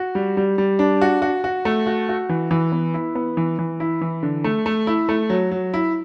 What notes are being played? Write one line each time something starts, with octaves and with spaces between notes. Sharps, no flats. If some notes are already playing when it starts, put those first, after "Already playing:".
Already playing: F#4
G3
G3
G3
D4
F#4
F#4
F#4
A3
F#4
F#4
E3
E3
B3
E4
B3
E3
E3
E4
E3
D3
A3
A3
E4
A3
F#3
F#3
E4